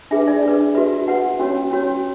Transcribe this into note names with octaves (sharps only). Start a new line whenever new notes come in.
D4 G#4 B4 E5
D5
D4 G#4 B4
F#4 B4 E5
F#4 B4 F#5
C#4 F#4 C#5
C#4 F#4 C#5